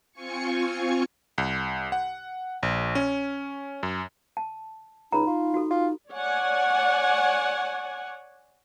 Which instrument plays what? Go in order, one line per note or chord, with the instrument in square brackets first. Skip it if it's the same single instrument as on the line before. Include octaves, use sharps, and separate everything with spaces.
[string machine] C4 F4 G#5 C#6 C#7
[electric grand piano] C2
F#5
A#1
C#4
F#2
[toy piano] A5
[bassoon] C#2 [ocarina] D#4 [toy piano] A#5 B5
[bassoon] F4
[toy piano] F#4 A4
[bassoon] F4
[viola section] C#5 D5 F#5 G#5